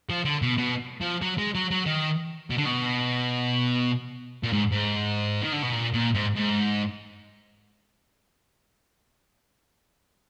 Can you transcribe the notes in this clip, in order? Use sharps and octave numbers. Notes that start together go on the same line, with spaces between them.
F3
D3
B2
B2
F3
F#3
G#3
F#3
F#3
D#3
B2
D3
B2
A#2
G#2
G#2
D#3
D3
B2
A#2
A#2
G#2
G#2